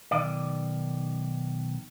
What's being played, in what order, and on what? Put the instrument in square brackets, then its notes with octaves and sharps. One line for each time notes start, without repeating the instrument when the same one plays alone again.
[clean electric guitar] B1 D#3 D5